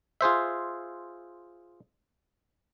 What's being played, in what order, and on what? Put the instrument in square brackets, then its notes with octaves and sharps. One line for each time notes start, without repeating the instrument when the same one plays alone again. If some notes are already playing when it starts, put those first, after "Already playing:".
[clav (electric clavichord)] F4 G#4 C5 E5